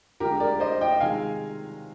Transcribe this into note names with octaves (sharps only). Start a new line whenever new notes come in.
D3 G#3 G4 A#4
A#4 D5
C5 D#5
D#5 G5
C3 D#3 G#3 F5 G#5